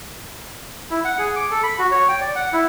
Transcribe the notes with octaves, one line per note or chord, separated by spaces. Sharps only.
E4
F#5
G#4
D6
A4
B5
F#4
C#5
G5
D5
F#5
E4